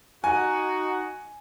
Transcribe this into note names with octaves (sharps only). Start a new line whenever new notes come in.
D#4 F#4 G#5